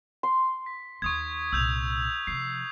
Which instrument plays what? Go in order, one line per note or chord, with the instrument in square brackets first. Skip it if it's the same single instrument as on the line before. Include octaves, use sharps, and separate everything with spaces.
[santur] C6
[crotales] B6
[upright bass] D#2 D#3 [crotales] C#6 D#6 G#6
[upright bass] C2 A#2 [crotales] E6 G6 F7
[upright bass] C3 F3 [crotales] C7